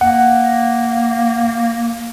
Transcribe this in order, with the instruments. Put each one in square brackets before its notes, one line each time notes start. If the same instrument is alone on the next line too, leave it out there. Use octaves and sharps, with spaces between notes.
[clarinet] A#3 [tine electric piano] F#5